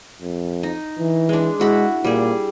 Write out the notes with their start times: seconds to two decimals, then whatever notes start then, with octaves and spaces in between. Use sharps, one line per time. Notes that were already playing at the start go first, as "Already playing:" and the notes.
0.21 F2
0.63 D#4
0.99 E3
1.29 G#3 D4
1.60 G#3 E4 F#4 B5
2.05 A#2 G3 G#4